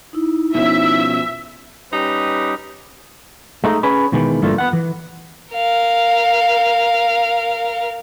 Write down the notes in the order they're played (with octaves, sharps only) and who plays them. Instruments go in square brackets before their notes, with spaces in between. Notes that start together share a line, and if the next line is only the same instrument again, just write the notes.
[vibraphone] D#4 E4
[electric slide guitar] B2 F3 C#4 [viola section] E5
[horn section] G3 C#4 D#4 G4 B4
[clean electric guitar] G#3 A3 D#4
C#4 G#4 B4
B2 D#3 E3 G#3
G2 D3 E3 A3 A#3 F4
B3 F#5
E3
[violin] A#4 F5